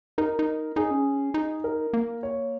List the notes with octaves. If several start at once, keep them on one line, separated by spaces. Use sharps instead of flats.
D#4 A#4
D#4
D#4 G#4
C#4
D#4
A#4
A#3
C#5